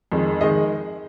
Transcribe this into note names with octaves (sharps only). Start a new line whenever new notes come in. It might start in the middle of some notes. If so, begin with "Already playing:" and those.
F2 D#3 G#3
D#3 G#3 D#5